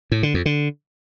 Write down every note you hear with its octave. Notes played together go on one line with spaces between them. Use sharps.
A2
D3
F2
D3